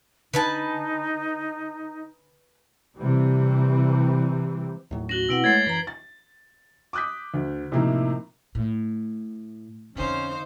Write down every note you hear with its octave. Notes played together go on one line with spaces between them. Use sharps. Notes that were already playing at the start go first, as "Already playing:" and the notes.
D3 D#4 B4 G#5 A5
C3 E3 G3 C4
D#2 A2 F#3
C#4 F#4 A#6 F#7 G7
B2 C4 E4 B4 F#5 A#6 D7 F#7
G#3 A3 C#5 G#6 A6 C7
F#2 E3 B4 A#5
A6
D6 D#6 F#6 G6 B6
D2
A2 C3 F3 A#3 D#4 E4
A2
F2 D3 C#4 D#4 C5 F5